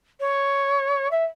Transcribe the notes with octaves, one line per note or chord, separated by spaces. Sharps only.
C#5
E5